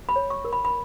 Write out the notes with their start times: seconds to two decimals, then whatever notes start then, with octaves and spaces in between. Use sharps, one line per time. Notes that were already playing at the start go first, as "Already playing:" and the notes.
0.09 B5
0.16 C#5
0.30 C#6
0.45 A#4
0.53 B5
0.65 B5